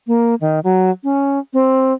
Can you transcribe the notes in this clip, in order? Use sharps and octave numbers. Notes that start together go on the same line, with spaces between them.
A#3
D#3
F#3
C#4
C4